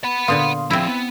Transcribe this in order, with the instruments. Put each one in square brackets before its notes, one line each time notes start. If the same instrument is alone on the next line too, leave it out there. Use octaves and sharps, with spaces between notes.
[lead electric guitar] F#5 B5
[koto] A#2 D3 B3 [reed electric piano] F5 C6 D#6
[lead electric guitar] F3 G#4 [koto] C4 E4
[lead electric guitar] B3